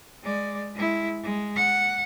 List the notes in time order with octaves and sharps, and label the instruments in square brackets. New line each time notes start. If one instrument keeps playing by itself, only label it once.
[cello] G#3 D5
G#3 E4
G#3
F#5